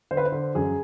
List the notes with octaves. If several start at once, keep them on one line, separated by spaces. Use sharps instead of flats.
D3 C5
B4
C5
D3
F#2 G#4